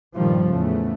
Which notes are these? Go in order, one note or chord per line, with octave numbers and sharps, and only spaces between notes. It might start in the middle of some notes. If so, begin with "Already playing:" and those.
G2 A#2 D#3 F3 G3
E2 A2 C#3 A3